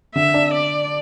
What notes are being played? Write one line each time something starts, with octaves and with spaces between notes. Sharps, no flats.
D3 E5
D4
D5